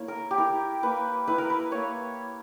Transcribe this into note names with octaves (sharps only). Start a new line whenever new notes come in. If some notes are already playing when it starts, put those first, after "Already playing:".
Already playing: A#3 E4 C#5
A#4
G4
E4 A#4
A#3 B4
E4 B4
A#4
B4
A#3 C#5